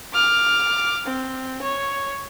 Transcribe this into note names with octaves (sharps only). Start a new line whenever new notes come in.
D6 F6
C4
C#5